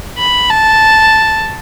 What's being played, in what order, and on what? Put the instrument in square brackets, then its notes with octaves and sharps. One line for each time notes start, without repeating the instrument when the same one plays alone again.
[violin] B5
A5